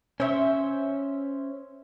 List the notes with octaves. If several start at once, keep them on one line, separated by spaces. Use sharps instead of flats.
C#4 C5 C#5 E5